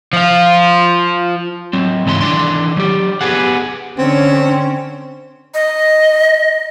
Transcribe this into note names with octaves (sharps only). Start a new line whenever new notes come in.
F3 F4
F#3 C4
C#2 G#2 E3 A#5 C6
D#3 E3 D4 C6
F#3 G4
B3 G4 G#4 F#5
D3 C4 C#4
D#5